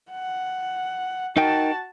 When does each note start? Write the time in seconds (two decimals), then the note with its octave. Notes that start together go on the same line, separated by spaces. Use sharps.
0.11 F#5
1.37 D#4 F#4 A#4 G5 A5